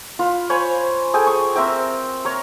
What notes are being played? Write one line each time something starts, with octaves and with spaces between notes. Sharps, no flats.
F4 B4
C5 C#5 G#5 B5
G#4 A4 G5 G#5
C#6
C4 A#4 E5 G5
A#4 C#5